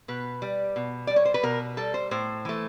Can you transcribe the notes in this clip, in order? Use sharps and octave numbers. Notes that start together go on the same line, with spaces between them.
B2 B4
G3
B2
G3 D5
C#5
C5
B4
B2 A#4
G3 A4
C5
A2 C5
E3 A3